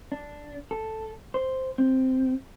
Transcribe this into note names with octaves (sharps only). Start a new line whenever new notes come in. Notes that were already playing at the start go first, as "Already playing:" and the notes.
D4
A4
C5
C4